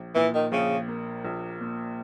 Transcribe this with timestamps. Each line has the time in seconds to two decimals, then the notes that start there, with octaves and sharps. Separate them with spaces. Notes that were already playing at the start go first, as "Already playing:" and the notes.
Already playing: A#1
0.15 A#2 E3
0.34 D#3
0.52 A#1 C#3
0.88 A#3
1.25 A#1
1.61 A#2